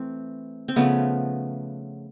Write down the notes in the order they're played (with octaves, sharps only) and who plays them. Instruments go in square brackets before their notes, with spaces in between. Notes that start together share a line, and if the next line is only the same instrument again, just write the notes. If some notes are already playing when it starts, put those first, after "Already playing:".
Already playing: [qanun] E3 A3 C4
C4
C#3 F3 A3 B3